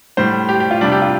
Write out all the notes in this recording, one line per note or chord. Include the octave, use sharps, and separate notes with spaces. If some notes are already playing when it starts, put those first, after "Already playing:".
A2 G3 C5
G4
G4
F4
C3 G3 D4
G4
F4